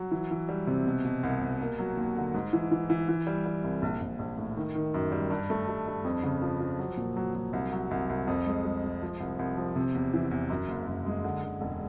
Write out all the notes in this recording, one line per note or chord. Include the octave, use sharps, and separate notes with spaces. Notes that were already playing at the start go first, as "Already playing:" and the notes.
Already playing: F#3
E3
E3
G3
C3
B2
B2
C2
B2
A#3
F#3
D#2
D3
G#2
E3
E3
E3
E3
G3
G3
C2
A#1
A#1
A#1
A2
D#3
D#3
F#2
G3
G2
A3
G2
G2
F2
C#3
F3
F3
F#3
A#2
F#3
F#3
C2
F#3
C2
C2
F2
G#3
G#3
G#3
F3
C2
C2
F3
C3
E2
E3
E2
F#2
F#1
F#2
G#3
D3
D3
E1